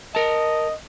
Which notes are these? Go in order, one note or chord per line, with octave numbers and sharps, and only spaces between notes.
A#4 D#5 A5